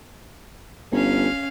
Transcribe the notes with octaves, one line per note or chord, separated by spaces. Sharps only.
G1 C#4 F5